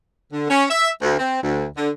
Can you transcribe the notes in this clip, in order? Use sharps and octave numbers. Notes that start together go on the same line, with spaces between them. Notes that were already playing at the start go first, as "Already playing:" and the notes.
D3
C#4
E5
D2
C4
D2
D3